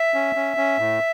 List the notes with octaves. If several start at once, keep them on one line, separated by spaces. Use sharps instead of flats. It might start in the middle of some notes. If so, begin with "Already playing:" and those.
Already playing: E5
C#4
C#4
C#4
A2